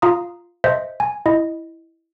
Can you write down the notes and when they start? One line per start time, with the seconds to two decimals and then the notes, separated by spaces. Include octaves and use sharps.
0.02 F4 F5 A#5 D#6
0.64 C5 D#5 E5
1.00 G#5
1.26 E4 D#5